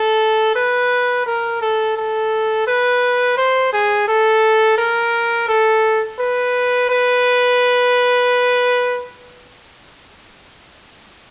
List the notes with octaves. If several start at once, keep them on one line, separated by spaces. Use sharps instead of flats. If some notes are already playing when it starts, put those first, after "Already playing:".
Already playing: A4
B4
A#4
A4
A4
B4
C5
G#4
A4
A#4
A4
B4
B4